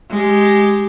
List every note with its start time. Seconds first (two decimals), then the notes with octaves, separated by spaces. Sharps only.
0.10 G#3 G4